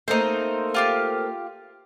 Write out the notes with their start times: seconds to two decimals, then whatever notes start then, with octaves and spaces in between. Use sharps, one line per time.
0.08 A3 A#3 C4 D#4 C5
0.74 F4 G4 F5